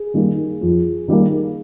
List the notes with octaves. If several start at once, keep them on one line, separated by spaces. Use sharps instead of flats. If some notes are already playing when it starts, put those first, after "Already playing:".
Already playing: G#4
D#3 G3 A#3
F2
D#3 G3 A#3